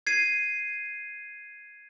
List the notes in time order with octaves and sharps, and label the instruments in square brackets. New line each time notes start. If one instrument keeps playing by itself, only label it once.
[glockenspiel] G#6 C7 D#7